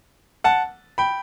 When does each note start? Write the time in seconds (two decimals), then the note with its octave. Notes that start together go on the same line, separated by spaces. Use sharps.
0.44 F#5 A5
0.98 G5 B5